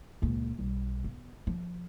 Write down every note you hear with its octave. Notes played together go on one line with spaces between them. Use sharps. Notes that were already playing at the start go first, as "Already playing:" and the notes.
C#2 A#2
B1 G3
B3
F3